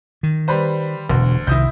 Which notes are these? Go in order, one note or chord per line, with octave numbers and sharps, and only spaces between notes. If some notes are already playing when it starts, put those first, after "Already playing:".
D#3
G3 B4 C5
E1 D2 B2
C2 D#3 E4 D#6 G6